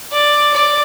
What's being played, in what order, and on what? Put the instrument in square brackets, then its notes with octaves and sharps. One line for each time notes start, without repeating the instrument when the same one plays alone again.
[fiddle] D5
D5